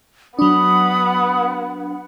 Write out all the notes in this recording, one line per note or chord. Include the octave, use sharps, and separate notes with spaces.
F#3 B3 D4 F#5 B5 D#6